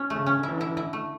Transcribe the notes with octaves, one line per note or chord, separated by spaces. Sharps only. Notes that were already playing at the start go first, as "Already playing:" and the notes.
Already playing: C#4
A3
C#3
C#4
D3
E3 E4
D3 E4
E3
D3 E4
A3